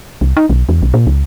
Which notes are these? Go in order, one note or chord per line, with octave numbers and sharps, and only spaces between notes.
C2
D#4
B1
E2
B1
A#2
C#2